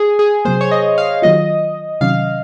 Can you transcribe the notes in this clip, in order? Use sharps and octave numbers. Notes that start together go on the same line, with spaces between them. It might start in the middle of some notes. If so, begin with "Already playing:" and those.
Already playing: G#4
G#4
C3 F#3 A#3 C5
C#5
D#5
F5
D#3 F#3 A#3 F4 D#5
C3 D#3 F#3 C#4 F5